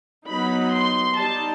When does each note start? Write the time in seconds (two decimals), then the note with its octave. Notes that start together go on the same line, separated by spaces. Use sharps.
0.27 F#3 B3 D#4 B5
0.74 C6
1.19 G3 D#4 A5